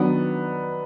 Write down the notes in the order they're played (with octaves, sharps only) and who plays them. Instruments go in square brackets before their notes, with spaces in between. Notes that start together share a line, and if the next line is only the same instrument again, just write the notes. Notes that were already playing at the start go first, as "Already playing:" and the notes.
Already playing: [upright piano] D#3 F#3 B3 D4